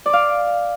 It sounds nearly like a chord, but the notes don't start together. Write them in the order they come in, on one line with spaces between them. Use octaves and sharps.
D5 D6 F5